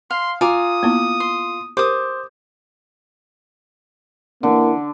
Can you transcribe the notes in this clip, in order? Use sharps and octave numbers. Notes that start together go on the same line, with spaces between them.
F5 C6
F4 G#5 A#5 D6 D#6
A#3 B3 E4
C6
G4 A#4 C5 D6 D#6
D3 E3 A#3